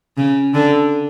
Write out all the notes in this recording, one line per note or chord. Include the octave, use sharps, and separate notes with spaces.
C#3
D3